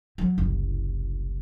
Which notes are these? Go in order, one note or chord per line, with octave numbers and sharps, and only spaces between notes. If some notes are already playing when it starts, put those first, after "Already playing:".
F3 F#3
F#1 C2